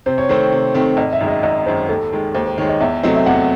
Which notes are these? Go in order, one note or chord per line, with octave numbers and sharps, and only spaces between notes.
C3 C5
C#5
D#3 A3 C4 C5
C3
D#3 A3 C4
G#1 D#5
E5
F#2 D#3 G#3
D#5
G#1 D#5
F#2 D#3 G#3 C5
D#2 A4
D#3 G#3
D#2 C5
C5
D#3 G#3 C#5
D#5
E2 E5
C3 F#3 A3 C4 D#5
E5
E2 F#5